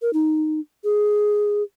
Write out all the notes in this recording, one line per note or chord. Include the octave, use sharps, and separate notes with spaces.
A#4
D#4
G#4